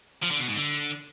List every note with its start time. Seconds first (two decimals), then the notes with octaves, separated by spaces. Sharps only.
0.23 F3
0.31 D3
0.40 B2
0.48 G#2
0.56 D3